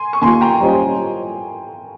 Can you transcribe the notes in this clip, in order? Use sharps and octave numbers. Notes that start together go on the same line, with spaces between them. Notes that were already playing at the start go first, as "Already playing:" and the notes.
Already playing: G#5 C6
C#6
D#2 D#3 A#3 F4 G#5 C6
G5 A#5
G3 C#4 F4 C5 D#5